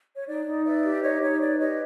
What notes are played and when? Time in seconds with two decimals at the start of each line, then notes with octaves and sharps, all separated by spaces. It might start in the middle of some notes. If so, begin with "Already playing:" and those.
0.16 C#5
0.28 D#4 D5
0.46 D#4
0.65 B4 D5 E5
0.84 G4
1.02 D#4 C#5 D#5
1.21 D#4 C#5
1.39 B4 D5
1.58 G4 C#5 D#5